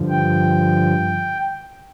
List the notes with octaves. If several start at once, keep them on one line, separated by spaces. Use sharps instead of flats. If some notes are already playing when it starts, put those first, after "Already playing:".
Already playing: G2 D3 F3
G5